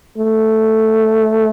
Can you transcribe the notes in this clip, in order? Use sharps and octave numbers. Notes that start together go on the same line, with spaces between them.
A3